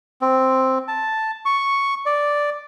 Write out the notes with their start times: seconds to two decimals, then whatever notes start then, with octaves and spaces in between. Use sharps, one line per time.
0.21 C4
0.88 A5
1.45 C#6
2.06 D5